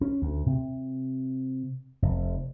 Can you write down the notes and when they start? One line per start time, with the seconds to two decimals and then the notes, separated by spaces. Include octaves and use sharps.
0.01 C#4
0.22 D2
0.46 C3
2.02 F1